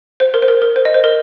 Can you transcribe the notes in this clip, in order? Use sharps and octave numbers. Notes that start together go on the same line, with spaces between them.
C5
A#4
C5
A#4
A#4
C5
D#5
C5
A#4